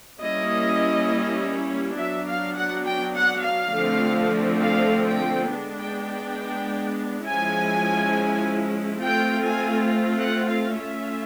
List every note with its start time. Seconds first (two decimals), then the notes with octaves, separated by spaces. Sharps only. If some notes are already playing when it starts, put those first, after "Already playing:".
0.22 G3 A#3 C#4 E4 D#5
1.99 F#3 B3 D4 E5
2.28 F5
2.56 F#5
2.86 G5
3.15 F#5
3.45 F5
3.74 D3 F3 A3 C4
4.61 F5
5.07 G5
5.50 G#3 B3 D4
5.79 G5
6.08 G5
7.26 F3 G#3 C#4 E4 G#5
9.02 A3 C4 F4 G5
9.45 G#5
10.19 F#5
10.48 F5
10.77 A3 C#4 F4 E5